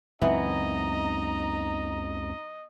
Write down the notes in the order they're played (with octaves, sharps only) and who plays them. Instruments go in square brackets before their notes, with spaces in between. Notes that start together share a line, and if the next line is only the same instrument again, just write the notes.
[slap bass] C#2 F#2 C4 [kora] E3 B3 [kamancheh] D#4 A#5 [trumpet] D#5